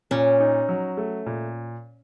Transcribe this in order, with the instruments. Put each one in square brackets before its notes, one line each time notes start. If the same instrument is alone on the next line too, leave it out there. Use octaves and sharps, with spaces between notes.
[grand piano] A#2 [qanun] C#4
[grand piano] D#4
F#3
A3
A#2